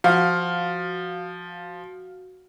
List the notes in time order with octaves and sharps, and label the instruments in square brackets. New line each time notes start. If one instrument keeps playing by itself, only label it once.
[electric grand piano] F3 [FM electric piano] F#4 [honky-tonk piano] F5